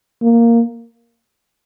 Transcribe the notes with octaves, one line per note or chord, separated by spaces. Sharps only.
A#3